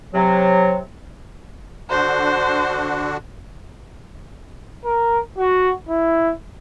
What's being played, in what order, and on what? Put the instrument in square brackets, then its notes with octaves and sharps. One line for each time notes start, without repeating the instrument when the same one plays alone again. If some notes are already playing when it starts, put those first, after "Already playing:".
[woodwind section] C3 F#3
[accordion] D3 D4 F#4 [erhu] C5
[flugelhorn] A#4
F#4
E4